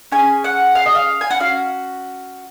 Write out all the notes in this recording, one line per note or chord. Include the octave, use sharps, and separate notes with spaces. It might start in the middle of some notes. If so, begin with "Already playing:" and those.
C#4 G#4 G#5
F#5
F5
D#5
F5
G#5
F#5
C#4 F#4 F5